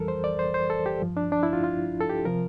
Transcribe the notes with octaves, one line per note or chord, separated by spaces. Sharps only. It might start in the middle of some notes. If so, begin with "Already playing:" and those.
Already playing: F2 E3 G3 A4 A#4
C5
D5
C5
C5
A4
G4
G2 F3
D4
D4
E4
F4
F4
A4
G4
C3 F3 A#4